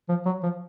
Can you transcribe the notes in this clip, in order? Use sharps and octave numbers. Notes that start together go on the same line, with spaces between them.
F3
F#3
F3